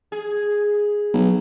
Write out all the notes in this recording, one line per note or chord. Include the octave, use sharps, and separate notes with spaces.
G#4
B1